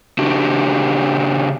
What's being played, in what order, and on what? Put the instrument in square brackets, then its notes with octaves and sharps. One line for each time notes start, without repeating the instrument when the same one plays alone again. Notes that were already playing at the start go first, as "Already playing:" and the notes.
[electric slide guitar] C#3 D4 F#4 G4